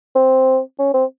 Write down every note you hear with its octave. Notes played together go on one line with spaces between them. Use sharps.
C4
C#4
C4